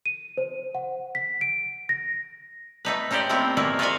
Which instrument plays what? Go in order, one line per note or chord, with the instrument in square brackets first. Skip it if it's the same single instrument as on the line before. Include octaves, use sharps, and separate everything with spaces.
[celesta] D#7
C5
F#5
B6
D7
A#6
[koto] A3 D#4 B4
C#4 D#4 G4 C5 D5
A3 B3 C4 E4 A#4 C5
A#2 D#3 A#3 E4
F4 F#4 G#4 E5 F5 G#5